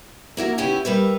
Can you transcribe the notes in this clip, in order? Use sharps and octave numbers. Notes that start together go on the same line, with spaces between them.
A#3 E4 F#4 A#4
C#3 B3 C#4 E4 G4 G#5
G3 A#4 B4 E5